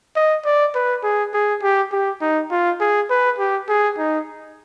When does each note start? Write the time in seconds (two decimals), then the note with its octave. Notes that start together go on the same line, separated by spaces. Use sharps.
0.16 D#5
0.45 D5
0.75 B4
1.03 G#4
1.34 G#4
1.62 G4
1.92 G4
2.21 D#4
2.51 F4
2.80 G#4
3.10 B4
3.39 G4
3.69 G#4
3.98 D#4